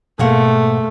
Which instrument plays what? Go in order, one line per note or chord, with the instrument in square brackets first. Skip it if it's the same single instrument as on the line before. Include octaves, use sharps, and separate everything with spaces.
[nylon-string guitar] G#2 A#3 F#5 [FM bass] B2 [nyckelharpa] A3